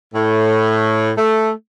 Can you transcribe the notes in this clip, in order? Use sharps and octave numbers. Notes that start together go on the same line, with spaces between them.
A2
A3